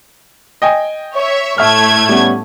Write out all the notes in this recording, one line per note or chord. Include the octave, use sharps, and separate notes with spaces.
D#5 G5 G#5
C#5 E5
A2 A3 E5 C#6 F6 G#6
G3 B3 C#4